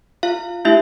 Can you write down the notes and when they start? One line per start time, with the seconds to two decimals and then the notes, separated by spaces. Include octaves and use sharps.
0.23 F4 F5
0.65 A3 D4 E4 G4 E5